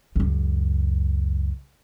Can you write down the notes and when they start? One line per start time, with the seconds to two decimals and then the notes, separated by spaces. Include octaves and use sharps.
0.16 C#2 F#2